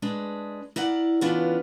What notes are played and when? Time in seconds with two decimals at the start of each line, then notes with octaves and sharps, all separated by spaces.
0.02 G#3 D4 G#4 B4
0.76 E4 A#4 D5 F#5
1.21 C#3 E3 B3 D4 F4 B4